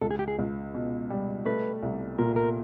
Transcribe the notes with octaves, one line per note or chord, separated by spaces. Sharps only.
C#2 A4
G#4
G4
G#4
C#2
B2
G3
A3 B4
C2
A#2 A#4
A#4